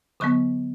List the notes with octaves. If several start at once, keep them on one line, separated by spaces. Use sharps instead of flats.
D3 F#3 B3 C#6